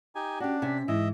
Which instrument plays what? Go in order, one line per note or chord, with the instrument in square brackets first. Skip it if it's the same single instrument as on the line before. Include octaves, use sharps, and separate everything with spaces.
[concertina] D#4 G4 G#5
[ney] C#4 [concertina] D4 [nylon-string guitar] F#4 G4 [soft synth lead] G5
[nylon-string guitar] C3 G#5 [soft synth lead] B6
[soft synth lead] G#2 [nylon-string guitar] E3 [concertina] D#5 E5